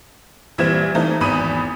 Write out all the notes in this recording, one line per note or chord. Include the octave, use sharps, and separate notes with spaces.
A#1 E3 G3 C4 G#6 E7
E3 A3 C4 D#4
G#1 E2 B5 D#6 D#7